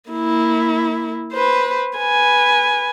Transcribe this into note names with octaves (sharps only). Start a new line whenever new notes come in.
A#3 E4
B4 C5
B4 G#5